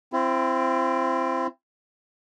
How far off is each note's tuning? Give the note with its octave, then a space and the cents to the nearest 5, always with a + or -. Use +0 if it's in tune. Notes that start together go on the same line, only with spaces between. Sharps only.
C4 +5 E4 +40